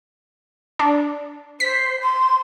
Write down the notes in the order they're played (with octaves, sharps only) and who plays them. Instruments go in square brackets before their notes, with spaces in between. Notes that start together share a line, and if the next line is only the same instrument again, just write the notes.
[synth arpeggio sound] D4
[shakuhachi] C5 [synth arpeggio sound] B6
[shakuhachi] C6